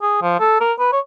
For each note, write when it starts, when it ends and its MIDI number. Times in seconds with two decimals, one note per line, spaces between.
0.02 0.18 68
0.22 0.35 53
0.39 0.60 69
0.61 0.73 70
0.79 0.91 71
0.92 1.00 73